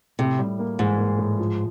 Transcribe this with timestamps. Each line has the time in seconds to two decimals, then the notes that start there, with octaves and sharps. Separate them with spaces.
0.19 A2 C3
0.39 G3
0.59 A#3
0.79 G#2 E3
0.98 A#3
1.18 A2
1.39 F3